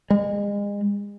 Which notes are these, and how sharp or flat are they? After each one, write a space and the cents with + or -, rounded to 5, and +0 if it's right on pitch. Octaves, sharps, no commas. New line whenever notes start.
G#3 -35